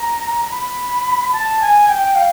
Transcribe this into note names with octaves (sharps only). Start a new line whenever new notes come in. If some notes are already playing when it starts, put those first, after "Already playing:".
Already playing: A#5
B5
A5
G#5
G5
F5